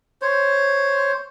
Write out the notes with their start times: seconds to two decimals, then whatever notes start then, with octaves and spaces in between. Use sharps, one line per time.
0.22 C5 C#5